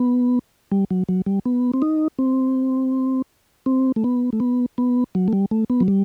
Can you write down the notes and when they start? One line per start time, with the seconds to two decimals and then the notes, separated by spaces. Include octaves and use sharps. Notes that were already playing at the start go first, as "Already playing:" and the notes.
Already playing: B3
0.71 G3
0.91 F#3
1.09 F#3
1.26 G3
1.45 B3
1.74 C4
1.82 D#4
2.19 C4
3.66 C4
3.96 A3
4.04 B3
4.33 A3
4.40 B3
4.78 B3
5.15 F#3
5.28 A3
5.33 G3
5.51 A3
5.70 B3
5.80 F#3
5.88 G3